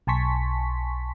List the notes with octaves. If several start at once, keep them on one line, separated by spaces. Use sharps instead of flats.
B1 G#5 A5 C6 C#6 B6